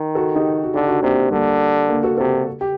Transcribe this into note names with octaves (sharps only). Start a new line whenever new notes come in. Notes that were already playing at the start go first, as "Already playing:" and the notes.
Already playing: D#3
F#4 A4
D#4 G4
F#4
D3 D#4 G4
D4 F#4
C3 A#3 D4
D3 G3 A#3
A#3 D4
F#4 A4
C3 F#4 A4
G4